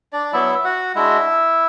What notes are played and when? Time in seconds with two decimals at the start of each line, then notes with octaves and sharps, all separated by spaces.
0.13 D4 D5
0.33 F#3 B3 E4 E5
0.55 E5
0.64 F#4 F#5
0.95 G#3 D4 E4 F#4 E5